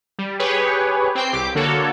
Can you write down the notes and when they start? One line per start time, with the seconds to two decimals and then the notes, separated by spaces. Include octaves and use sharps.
0.19 G3
0.39 G4 G#4 B4 C#5
1.15 C4 G5 C7
1.33 C2 G4 D6
1.55 D3 A#3 F#4 A4 C#5